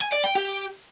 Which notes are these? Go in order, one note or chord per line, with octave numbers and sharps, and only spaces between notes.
G#5
D5
G5
G4